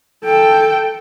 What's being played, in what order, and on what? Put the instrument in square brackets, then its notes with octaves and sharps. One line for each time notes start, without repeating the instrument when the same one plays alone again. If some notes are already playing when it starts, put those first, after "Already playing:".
[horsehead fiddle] A4 G5